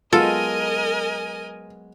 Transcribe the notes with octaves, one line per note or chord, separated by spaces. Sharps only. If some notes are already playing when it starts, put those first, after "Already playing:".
F#3 G#3 B3 F4 A4 A#4 D#5 G#5